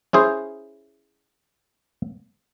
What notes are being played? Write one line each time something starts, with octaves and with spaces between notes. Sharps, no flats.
C#4 E4 G#4 C5